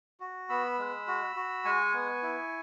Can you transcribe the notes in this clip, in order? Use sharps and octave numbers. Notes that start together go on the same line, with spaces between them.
F#4
B3 B5 E6
G#3
F#4
F#4
G#3 G#5 C#6
B3
E4